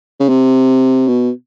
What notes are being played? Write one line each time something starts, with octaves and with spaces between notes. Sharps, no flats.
C#3
C3
B2